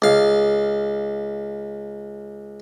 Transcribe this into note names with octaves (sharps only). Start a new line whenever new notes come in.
C#2 F5